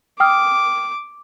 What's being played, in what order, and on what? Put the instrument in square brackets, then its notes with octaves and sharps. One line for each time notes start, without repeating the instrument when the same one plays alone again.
[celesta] G5 D#6 F6 [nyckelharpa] D6